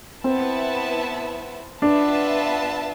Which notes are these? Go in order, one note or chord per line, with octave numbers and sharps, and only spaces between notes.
B3 C4 E4 B4 E5 A5
B3 D4 F4 B4 E5 A5